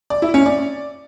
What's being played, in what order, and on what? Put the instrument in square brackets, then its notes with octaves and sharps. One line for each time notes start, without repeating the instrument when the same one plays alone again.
[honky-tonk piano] D5
E4
C#4
D5